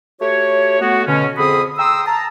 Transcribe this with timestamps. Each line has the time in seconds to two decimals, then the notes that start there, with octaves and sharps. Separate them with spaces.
0.21 A3 F#4 G4 C#5
0.81 A3 B3 F#4
1.07 B2 D3 C#4
1.37 F2 D3 C4 G#4 B5 D#6
1.78 G5 A#5 C6 D#6 E6
2.07 A5 A#5